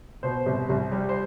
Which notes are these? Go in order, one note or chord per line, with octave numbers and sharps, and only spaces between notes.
B2 C5
C2
C2
G3
C5